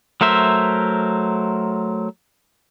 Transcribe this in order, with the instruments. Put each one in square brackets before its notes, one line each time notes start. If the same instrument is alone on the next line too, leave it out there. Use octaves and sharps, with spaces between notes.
[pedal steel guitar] F#3 A3 A#4 C5 E5